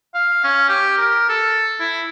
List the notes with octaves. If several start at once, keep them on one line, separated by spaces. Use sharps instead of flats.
F5
C#4
G4
A#4
A4
E4